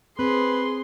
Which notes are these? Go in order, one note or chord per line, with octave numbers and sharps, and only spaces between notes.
C4 G#4 B4 C6